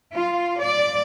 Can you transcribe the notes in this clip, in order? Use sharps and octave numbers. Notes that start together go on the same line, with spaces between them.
F4
D5